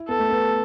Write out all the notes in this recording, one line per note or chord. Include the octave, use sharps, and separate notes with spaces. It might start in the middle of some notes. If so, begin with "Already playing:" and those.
Already playing: E4
B3 A4
A3
B3